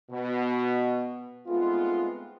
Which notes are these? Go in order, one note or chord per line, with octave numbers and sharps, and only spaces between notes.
B2
G#3 A3 B3 C4 D#4 F4